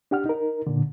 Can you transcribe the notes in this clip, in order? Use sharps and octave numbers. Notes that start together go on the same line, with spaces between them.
D4 G4 F#5 F6
D#4 A#4
A#2 D3